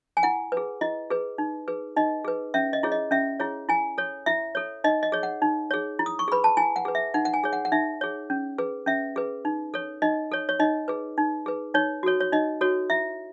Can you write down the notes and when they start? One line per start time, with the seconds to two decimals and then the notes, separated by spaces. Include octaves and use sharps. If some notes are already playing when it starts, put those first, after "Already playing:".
0.17 G#5
0.23 E4 F#5
0.52 B4
0.57 G#4
0.81 E4 D#5
1.11 G#4 B4
1.38 D#4
1.68 G#4 B4
1.96 D#4 D#5
2.25 G#4 B4
2.54 C#4 E5
2.73 D#5
2.83 E4 G#4 C#5
2.92 D#5
3.11 C#4 E5
3.40 E4 G#4 C#5
3.69 E4 G#5
3.98 A4 C#5
4.26 E4 E5
4.55 A4 C#5
4.84 D#4 D#5
5.03 D#5
5.12 G#4 C#5
5.23 F#5
5.42 D#4
5.71 G#4 C#5
5.99 E4
6.06 D#6
6.19 C#6
6.28 G#4 B4 B5
6.44 A5
6.57 E4 G#5
6.76 F#5
6.85 G#4 B4
6.95 E5
7.14 D#4 F#5
7.25 F#5
7.34 G#5
7.44 G#4 C#5
7.53 F#5
7.65 F#5
7.72 D#4 E5
8.01 G#4 C#5
8.30 C#4
8.58 G#4 B4
8.86 C#4 E5
9.16 G#4 B4
9.45 D#4
9.74 A4 C#5
10.02 D#4 D#5
10.32 A4 C#5
10.49 C#5
10.60 D#4 D#5
10.88 G#4 B4
11.18 D#4
11.46 G#4 B4
11.74 D#4 C#5
12.03 F#4 A4 C#5
12.20 C#5
12.33 D#4 D#5
12.61 F#4 A4 C#5
12.90 E4 E5